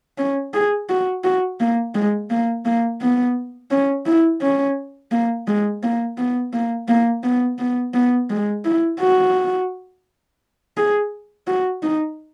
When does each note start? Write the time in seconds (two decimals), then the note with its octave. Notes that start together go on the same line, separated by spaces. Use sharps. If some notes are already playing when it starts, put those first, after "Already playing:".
0.18 C#4
0.54 G#4
0.89 F#4
1.24 F#4
1.60 A#3
1.95 G#3
2.30 A#3
2.65 A#3
3.01 B3
3.71 C#4
4.06 E4
4.42 C#4
5.12 A#3
5.47 G#3
5.83 A#3
6.18 B3
6.53 A#3
6.88 A#3
7.23 B3
7.59 B3
7.94 B3
8.30 G#3
8.65 E4
9.00 F#4
10.77 G#4
11.47 F#4
11.83 D#4